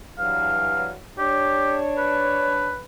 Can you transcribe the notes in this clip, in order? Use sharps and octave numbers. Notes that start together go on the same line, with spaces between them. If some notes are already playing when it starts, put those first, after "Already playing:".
G2 E3 F#3 F5
D4 G4 C#5
B4